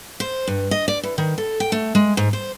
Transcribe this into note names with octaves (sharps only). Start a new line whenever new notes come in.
C5
G2
D#5
D5
E3
D#3
A4
G5
A3
G#3
G#2
C5